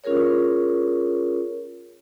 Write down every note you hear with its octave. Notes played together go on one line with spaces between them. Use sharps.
C#4 F4 G#4 A#4 C#5